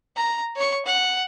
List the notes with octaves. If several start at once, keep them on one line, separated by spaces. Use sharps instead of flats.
A#5
C#5 C#6
F#5